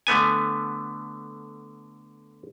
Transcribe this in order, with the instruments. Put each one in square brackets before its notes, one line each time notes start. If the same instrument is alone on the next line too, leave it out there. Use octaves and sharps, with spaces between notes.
[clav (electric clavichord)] D3 A3 B3 G#5